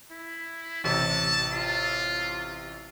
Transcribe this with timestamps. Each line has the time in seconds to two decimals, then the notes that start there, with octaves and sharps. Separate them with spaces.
0.11 E4
0.84 A1 C3 A5
1.52 F4